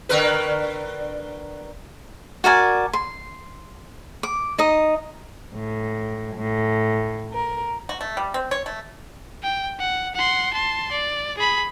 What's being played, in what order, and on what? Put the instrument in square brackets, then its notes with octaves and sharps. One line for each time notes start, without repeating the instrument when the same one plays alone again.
[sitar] D3 A#4 B4
[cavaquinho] F#4 A#4 D5 G#5
C6
D6
D#4 D#5
[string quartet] A2
A2
A#4
[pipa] F#4
A3
G3
C4
C#5
A3
[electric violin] G5
F#5
F#5 C6
A5 C6
D5
G#4 B5